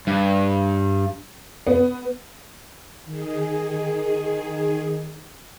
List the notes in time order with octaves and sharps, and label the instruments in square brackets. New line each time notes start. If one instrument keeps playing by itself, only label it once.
[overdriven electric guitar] G2
[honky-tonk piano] B3
[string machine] D#3 G#4